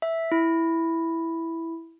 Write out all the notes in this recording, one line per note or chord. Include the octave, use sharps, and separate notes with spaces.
E5
E4